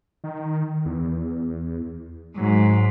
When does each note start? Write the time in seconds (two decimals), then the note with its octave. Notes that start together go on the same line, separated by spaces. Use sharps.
0.24 D#3
0.85 E2
2.37 G#2 F#3